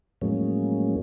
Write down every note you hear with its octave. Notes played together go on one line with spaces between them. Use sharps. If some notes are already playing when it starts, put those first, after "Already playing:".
F2 A2 F#3 G#3 A#3 C#4